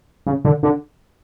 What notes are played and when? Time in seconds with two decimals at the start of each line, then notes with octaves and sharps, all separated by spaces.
0.27 C#3
0.45 D3
0.63 D3